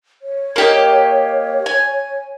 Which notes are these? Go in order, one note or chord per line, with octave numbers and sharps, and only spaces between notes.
C#5
A#3 G4 D#5
G#5